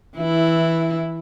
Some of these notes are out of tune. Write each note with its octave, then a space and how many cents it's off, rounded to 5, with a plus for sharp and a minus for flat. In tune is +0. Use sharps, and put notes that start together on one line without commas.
E3 -10 E4 +0